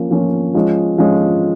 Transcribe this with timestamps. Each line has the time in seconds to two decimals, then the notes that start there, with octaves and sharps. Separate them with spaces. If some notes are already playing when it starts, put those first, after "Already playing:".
Already playing: F3 A#3 C#4 F4
0.10 F3 A#3 C#4 F4
0.54 F3 G#3 C#4
0.98 F3 G#3 C#4